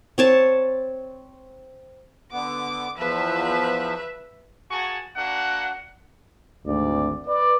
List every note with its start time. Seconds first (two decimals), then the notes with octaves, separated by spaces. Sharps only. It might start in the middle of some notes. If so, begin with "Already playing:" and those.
0.18 C4 C#5 A5
2.32 D3 B3 D6
2.98 E2 F3 B4 E5
4.71 A#3 F#4 G#4 G#5 A5 C#6
5.16 A#3 D4 F#4 F#5
6.66 G#1 D2 D5
7.27 B4 D5